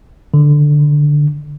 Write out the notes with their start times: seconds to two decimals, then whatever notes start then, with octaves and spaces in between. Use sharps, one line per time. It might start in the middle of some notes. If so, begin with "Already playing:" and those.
0.34 D3